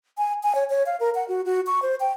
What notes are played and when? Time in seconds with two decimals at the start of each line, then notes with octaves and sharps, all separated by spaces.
0.18 G#5
0.43 G#5
0.55 C#5
0.70 C#5
0.86 F5
1.00 A#4
1.15 F#5
1.28 F#4
1.45 F#4
1.67 C#6
1.82 C5
2.00 G5